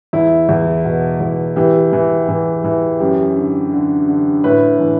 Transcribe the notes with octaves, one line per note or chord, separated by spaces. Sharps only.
E2 E4
E2
B2
E2
E3 G4
E3
E3
E3
F#2 G4
D3
D3
D3
A2 B4
E3